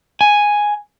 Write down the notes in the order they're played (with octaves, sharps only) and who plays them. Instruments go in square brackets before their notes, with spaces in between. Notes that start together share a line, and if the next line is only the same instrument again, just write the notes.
[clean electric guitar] G#5